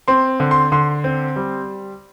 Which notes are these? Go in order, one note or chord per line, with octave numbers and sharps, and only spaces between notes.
C4 C6
D3
C6
D3 C6
C4
G3